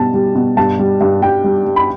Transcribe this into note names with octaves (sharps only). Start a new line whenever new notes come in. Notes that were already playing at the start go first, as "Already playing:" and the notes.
Already playing: B2 G3 A5
G3
B2
G2 A5
G3
G2
G3 G5
G3
G3
B5